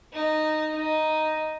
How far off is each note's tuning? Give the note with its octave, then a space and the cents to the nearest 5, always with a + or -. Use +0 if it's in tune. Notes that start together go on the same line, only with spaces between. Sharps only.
D#4 -10
D#4 +0